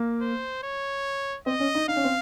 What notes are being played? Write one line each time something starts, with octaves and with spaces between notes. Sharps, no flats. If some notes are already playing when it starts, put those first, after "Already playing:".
Already playing: A#3
C5
C#5
C4 D#5
C#4
D#4
D#4 F5
C#4
C4